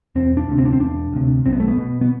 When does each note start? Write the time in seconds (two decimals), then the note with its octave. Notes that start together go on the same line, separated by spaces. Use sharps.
0.15 E1 C4
0.37 D4
0.48 D2 C3
0.58 C4
0.65 D4
0.73 C4
0.80 E1 D4
1.12 D2 C3
1.45 B1 C4
1.53 B3
1.60 A3
1.68 B3
1.77 B2
2.01 B3